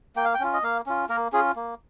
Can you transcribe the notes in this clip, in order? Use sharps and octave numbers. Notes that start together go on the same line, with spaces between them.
A#3 G5
F5
G5
C#4 F4
D#5
A#3 F5
C#4 F4
A#3 A#4
C#4 F4 G#4
A#3